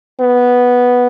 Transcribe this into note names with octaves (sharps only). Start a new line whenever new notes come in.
B3